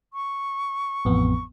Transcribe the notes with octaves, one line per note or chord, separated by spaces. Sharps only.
C#6
A1 F2 B3